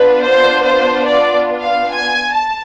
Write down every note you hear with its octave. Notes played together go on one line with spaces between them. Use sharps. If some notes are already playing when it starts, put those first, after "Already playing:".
Already playing: B3 D4 F4 B4
C5
C5
D5
F5
G#5
A5